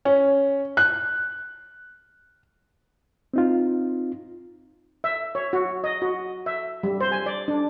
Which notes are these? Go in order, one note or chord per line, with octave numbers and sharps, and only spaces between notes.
C#4
F#6
C4 D#4 F4
E5
C#5
F#4
D#5
F#4
E5
G3
C5
G#5
D5
D4